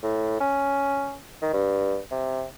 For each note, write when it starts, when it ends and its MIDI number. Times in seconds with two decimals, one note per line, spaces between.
0.03 0.40 45
0.40 1.17 61
1.42 1.50 51
1.53 1.99 43
2.11 2.45 48